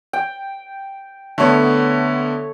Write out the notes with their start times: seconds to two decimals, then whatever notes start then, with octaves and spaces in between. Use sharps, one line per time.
0.13 G5
1.38 D3 A3 B3 C#5